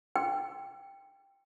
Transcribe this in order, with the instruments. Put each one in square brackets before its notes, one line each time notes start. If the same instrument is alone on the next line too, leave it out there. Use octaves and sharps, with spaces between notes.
[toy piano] G5